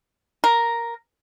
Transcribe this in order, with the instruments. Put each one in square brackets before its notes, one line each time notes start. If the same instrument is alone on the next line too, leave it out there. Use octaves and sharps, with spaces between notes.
[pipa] A#4